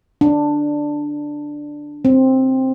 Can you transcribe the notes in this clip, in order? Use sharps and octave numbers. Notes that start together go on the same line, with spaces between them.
D4
C4